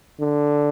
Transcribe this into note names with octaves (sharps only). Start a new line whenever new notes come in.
D3